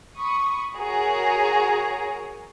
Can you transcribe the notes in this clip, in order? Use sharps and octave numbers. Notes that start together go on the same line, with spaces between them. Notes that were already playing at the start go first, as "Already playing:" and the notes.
B5 C#6 D#6
F#4 G#4 A#4 C#5 A#5